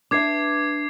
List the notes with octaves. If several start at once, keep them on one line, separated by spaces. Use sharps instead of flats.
D4 B4 E5 D6 G#6 C7